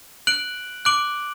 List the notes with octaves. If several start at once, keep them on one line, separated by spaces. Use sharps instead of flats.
F#6 D7 F#7
D6 F#6 D7 F#7